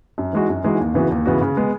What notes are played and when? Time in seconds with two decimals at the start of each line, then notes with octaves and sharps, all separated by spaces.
0.18 F#2
0.33 E3 G#3 D#4 F#4
0.49 F#2
0.64 E3 G#3 D#4 F#4
0.80 D#2
0.94 C#3 E3 B3 F#4
1.11 D#2
1.26 C#3 E3 B3 F#4
1.41 C#3
1.57 G#3 B3